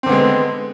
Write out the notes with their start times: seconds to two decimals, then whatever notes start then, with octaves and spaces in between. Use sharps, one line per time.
0.03 C4
0.06 D3
0.09 B3
0.12 G#3